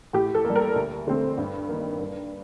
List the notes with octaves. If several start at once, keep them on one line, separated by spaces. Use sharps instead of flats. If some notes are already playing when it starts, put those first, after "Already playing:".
A2 G4
A4
G3 A#3
A#4
D2
D3 A3 C4
G2
D#3 A#3
G2